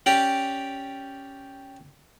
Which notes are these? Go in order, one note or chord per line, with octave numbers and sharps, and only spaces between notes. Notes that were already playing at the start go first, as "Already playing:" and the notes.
C#4 G4 D5 G5 A#5